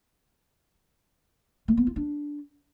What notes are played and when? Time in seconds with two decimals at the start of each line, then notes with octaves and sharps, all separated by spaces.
1.68 A3
1.77 B3
1.87 F4
1.96 D4